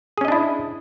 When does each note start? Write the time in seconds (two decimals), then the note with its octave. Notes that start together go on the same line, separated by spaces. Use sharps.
0.18 G#4
0.21 C#4
0.25 D#5
0.28 D4
0.32 E4